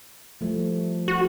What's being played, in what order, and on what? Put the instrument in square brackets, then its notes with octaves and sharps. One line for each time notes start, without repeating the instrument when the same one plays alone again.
[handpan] F3 G3 A3
[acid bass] F#4